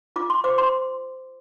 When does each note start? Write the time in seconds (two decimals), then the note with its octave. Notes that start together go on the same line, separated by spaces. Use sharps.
0.16 F4 D6
0.30 C6
0.44 C5 D6
0.58 C6